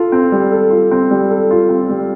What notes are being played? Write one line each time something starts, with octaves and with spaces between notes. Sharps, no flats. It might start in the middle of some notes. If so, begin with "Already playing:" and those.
Already playing: F4 A4
C4
G3
A4
F4
C4
G3
A4
F4
C4
G3